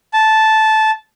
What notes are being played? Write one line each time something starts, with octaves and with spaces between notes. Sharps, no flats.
A5